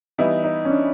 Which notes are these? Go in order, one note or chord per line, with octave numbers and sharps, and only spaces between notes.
E3 G3 B3 D#4 E4
D#4
C#4
D4